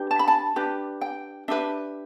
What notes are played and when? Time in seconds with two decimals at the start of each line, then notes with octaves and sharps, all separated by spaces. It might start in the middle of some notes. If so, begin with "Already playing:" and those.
Already playing: D4 G4 B4
0.11 A5
0.19 B5
0.28 A5
0.56 D4 G4 B4
1.01 G5
1.48 D4 G4 B4 E5